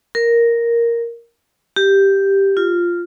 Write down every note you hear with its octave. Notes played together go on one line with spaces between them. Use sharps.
A#4
G4
F4